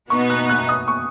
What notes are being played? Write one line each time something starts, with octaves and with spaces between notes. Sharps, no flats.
B2 B3 D#4 C#6
F#6
F#6
D#6
C#6